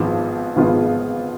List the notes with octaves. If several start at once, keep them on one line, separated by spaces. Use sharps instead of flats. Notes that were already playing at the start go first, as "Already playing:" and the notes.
Already playing: G#1 G#2 F3 B3 F4
G#1 G#2 F3 B3 F4